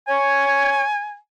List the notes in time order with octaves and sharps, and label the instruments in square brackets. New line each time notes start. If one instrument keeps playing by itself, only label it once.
[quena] C#5 [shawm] G#5